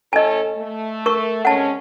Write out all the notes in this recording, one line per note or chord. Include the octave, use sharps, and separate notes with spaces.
A2 C#4 A4 D#5 G#5
A3
A#4 C#6
C3 G#3 C#4 F#5 A5